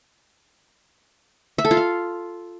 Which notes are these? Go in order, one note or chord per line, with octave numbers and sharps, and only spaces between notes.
E5
A4
F4
F5